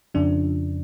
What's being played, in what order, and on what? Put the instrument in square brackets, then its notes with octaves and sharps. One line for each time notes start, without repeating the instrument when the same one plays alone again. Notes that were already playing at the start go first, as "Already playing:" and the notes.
[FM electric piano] F2 C#3 F3 D4